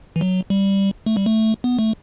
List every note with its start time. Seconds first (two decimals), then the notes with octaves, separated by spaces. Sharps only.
0.16 E3
0.21 F#3
0.50 G3
1.06 A3
1.17 G3
1.26 A3
1.64 B3
1.79 A3